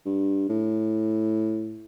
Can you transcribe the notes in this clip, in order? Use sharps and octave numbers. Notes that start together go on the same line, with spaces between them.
G2
A2